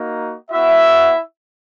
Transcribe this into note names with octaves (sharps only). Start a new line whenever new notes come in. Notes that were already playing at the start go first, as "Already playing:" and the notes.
Already playing: A#3 D#4 F#4
B3 E4 F#4 E5